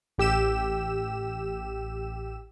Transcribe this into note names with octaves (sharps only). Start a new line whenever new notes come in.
A1 G4 E6 E7